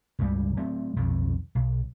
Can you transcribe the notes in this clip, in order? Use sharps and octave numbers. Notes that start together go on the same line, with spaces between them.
C#2 G2 C#3 G3
F#3 A3 C4
B1 F2 D#3
B1